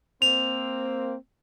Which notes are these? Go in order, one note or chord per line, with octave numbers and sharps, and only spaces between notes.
A#3 C4 F7